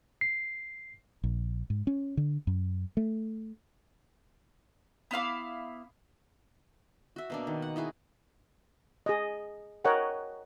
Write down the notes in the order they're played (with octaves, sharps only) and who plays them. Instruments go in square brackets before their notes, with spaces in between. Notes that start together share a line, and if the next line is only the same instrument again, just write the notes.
[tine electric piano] C7
[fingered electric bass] A#1
G#2
C#4
D3
F#2
A3
[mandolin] B3 E4 F5 D6
[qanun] F#4 E5
B2 A#3 D4
D#3
F#5
D#4 E4 F#4 G#4
[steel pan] G#4 D#5
A#4 C#5 D#5 F#5 G5